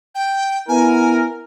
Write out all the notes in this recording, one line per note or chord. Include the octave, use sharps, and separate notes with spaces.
G5
B3 E4 A#4 G#5